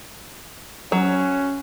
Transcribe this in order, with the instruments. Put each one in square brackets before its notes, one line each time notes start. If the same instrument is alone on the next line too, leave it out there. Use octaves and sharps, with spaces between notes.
[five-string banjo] F#3 [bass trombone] C#4